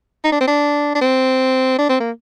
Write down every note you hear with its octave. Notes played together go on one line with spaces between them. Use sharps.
D#4
D4
C4
D4
D4
C4
D4
C4
A#3